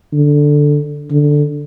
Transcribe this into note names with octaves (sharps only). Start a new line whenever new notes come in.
D3
D3